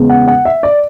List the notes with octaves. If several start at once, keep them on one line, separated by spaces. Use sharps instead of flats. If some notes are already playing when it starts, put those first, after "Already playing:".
Already playing: E2 C#3 G#3 B3
F#5
F#5
E5
D5